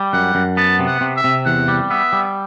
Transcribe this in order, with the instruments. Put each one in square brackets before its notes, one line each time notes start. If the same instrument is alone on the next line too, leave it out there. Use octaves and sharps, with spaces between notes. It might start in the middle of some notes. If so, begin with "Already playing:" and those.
Already playing: [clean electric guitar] G3
[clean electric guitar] F#2 [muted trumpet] F#5
[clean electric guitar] F#2
[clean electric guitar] B3 [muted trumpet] A5
[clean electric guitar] C3
[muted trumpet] F#5
[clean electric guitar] C3
[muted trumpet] E5
[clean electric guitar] C3
[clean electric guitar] E2 [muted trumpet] F#5
[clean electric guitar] G3
[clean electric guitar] B3 [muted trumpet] E5
[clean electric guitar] G3